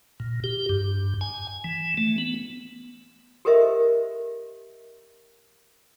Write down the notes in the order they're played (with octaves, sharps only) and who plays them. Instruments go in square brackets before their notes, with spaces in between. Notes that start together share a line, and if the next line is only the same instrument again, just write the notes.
[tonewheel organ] A#2
G4
G2
G#5
E3
A3
B3
[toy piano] G4 A4 A#4 C5 D#5 E5